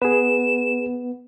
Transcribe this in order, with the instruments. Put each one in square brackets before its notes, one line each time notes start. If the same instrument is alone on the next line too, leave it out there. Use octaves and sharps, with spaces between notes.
[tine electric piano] B3 [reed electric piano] G#4 B4 [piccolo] E7